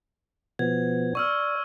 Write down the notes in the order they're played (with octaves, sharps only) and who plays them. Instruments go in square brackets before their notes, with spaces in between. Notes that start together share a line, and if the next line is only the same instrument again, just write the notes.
[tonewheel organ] B2 F3 B3 [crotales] G#6
[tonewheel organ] D5 [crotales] C#6 E6 F6